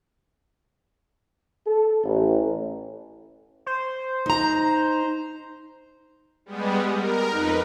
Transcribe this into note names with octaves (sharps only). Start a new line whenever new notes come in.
A4
A1
C5
D#4 A#5
G3 G#3 B3
A#4
F2 D#4 B4